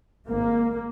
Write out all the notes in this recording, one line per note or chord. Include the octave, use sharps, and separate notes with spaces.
G#1 G#2 A#3